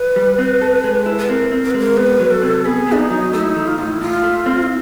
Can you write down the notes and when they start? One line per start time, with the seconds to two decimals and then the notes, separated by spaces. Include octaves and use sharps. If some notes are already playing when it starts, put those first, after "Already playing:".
Already playing: B4
0.16 G3
0.38 C4
0.62 A4
0.84 G#3
1.06 E4
1.18 B4
1.29 C4 A#4
1.51 C4
1.63 A#4
1.71 B4
1.74 G#3 A#4
1.97 B3 B4
2.20 F#3
2.31 A4
2.42 C3
2.65 B3 G#4
2.87 B3
2.92 D4
2.98 D#4
3.10 F#3
3.33 A3 D#4
3.41 E4
3.49 D#4
3.55 E3
3.67 F4
3.78 A2 D#4
3.90 E4
4.01 A2 F4
4.23 A3
4.46 C4
4.63 E4